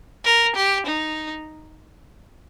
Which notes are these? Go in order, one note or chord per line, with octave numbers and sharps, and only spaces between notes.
A#4
G4
D#4